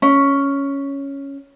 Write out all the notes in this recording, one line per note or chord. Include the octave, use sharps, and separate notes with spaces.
C#4